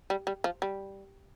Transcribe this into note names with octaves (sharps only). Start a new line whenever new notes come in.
G3
G3
F3
G3